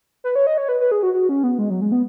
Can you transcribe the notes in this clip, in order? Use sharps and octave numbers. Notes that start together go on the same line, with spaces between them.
B4
C#5
D#5
C#5
B4
B4
G#4
F#4
F#4
C#4
B3
G#3
F#3
G#3
B3